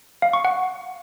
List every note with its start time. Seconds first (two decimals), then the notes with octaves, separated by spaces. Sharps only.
0.22 F5
0.33 C#6
0.45 F#5